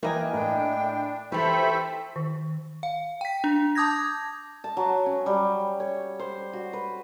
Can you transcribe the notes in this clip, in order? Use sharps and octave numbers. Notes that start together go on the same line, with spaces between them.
E3 A#3 A#4 D#5 G5 G#5
A2 D4 G5
E3 A3 G4 A4 C5 E5 B5
D#3
F5
G5 B6
D4
A5 D6 D#6 G6 G#6 A#6
A5
F#3
C#4
G3
C#5
C5
F#4
B4